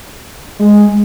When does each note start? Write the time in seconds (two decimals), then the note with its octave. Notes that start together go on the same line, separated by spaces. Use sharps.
0.59 G#3